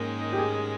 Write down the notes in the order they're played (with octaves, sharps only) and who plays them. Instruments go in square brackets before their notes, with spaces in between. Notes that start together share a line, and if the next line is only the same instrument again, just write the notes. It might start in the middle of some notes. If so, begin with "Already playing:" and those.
Already playing: [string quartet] G#2 D#3 G#3 C#4 [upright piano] A#3
[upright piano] G4
G#4